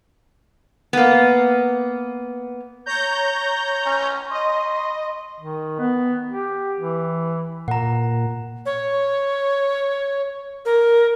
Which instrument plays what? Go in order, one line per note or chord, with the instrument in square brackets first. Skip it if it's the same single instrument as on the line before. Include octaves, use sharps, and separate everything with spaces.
[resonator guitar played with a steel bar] A#3 B3
[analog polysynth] C#5 A#5 G6
[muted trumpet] C#4
[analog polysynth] D#5 [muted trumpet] C6
[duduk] D#3
B3
G4
E3
[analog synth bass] A#2 [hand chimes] F#5 A#5
[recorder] C#5
A#4